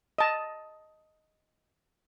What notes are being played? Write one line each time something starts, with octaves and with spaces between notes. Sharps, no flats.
D#5 A5